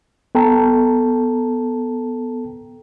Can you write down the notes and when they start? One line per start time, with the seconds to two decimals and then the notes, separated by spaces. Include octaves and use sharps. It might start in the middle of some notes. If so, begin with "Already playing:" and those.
0.35 B3 A4 G5 A5 A#5